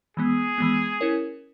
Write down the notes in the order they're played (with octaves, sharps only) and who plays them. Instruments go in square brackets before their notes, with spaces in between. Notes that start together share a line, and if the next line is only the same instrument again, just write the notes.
[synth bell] E3 G#3 B3 [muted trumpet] G#4
[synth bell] E3 G#3 B3
C#4 E4 A#4 C#5